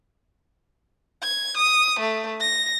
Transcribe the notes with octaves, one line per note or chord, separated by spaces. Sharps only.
G#6
D#6
A3
A#6